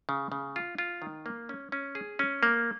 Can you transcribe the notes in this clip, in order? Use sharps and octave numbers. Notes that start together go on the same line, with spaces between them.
C#3
C#3
F4
F4
D#3
A#3
C#4
C#4
G#4
C#4
A#3